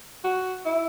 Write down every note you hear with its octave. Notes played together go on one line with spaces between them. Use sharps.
F#4
E4